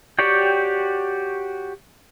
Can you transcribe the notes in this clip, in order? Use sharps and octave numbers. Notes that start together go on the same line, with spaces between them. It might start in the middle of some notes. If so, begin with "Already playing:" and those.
F#4 G4 C#5 D5 G5